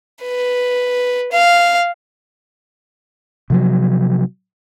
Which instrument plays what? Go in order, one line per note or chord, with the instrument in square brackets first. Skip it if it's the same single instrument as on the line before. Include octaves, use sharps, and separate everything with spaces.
[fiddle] B4
F5
[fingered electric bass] C3 F3 F#3